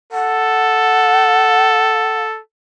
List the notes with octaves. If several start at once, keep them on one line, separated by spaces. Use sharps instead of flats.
A4 F#5